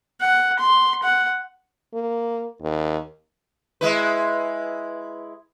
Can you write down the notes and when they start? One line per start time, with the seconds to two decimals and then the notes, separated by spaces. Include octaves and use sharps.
0.20 F#5
0.59 C6
1.03 F#5
1.94 A#3
2.62 D#2
3.81 G#3 E4 B4